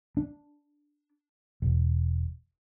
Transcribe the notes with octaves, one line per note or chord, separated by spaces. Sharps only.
D4
E1